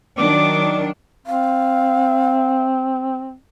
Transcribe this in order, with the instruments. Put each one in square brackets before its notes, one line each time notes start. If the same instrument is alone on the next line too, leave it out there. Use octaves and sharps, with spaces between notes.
[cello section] D#3 F#3 D4 [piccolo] D6
[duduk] C4 [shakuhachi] F5